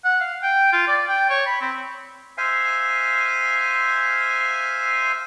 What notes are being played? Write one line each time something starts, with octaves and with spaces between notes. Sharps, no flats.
F#5
F5
G5
F4
D5
G5
C#5
B5
C4
C5 E5 F5 G#5